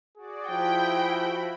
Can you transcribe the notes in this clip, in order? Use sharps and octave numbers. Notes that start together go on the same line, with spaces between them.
F#4 G#4 D5
F3 E4 F#4 G5 B5